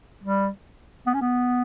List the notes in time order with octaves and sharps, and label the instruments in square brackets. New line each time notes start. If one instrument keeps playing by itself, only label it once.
[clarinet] G3
B3
C#4
B3